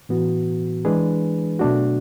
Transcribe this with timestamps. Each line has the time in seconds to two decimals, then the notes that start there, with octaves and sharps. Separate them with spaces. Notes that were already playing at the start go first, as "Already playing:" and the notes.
0.09 A2 E3 B3 F#4
0.85 E3 G#3 D4 G#4 B4
1.59 B2 F#3 A3 D4 F#4